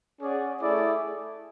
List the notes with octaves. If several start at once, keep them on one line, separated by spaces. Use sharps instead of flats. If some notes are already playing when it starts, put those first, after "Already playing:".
C#4 G#4 D5 F#5
A3 E4 G#4 D5